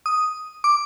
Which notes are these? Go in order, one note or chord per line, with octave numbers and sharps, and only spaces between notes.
D#6
D6